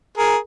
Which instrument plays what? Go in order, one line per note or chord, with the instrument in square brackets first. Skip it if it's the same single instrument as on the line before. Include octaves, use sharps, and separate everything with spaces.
[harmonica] G#4 A#4